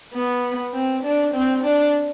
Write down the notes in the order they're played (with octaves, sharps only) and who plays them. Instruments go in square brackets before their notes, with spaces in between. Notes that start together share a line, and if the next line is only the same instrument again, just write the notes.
[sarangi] B3
C4
D4
C4
D4